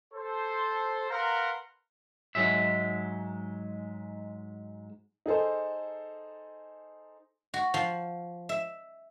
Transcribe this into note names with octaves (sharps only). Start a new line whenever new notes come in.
A4 C5
A#4 B4 F5 F#5 A#5 C6
G#2 C#3 F#3 G#3 E5
D#4 G#4 A4 C5
F#4
F3
E5